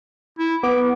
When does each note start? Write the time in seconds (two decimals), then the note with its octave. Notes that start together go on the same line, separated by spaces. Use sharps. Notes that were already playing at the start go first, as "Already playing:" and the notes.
0.39 E4
0.63 B3 D6